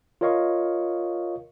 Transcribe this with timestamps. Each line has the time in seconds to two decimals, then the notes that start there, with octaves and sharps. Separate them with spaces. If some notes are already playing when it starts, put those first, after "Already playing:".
0.21 F4 A#4 C#5 D#5 F5 C#6